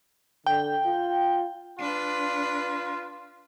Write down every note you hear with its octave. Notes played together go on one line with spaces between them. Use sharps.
D3 G5
F4
D4 F4 B4